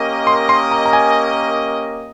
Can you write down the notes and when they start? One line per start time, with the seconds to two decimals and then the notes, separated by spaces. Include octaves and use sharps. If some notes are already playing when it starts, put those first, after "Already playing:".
Already playing: A#3 C#4 G4 A#4 D#5
0.27 C6
0.49 C6
0.71 A#5
0.86 A#5
0.93 G#5